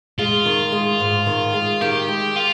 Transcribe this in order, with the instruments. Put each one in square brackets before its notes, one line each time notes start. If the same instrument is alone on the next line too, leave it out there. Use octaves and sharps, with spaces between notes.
[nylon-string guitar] G#3 [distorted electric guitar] F4
[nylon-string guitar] D#3
G#3
G#2
D#3
G#3
[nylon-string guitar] D#3 [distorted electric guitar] G4
[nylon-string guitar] G#3
[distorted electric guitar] F4